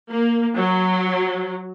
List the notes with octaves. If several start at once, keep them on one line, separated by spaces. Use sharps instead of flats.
A#3
F#3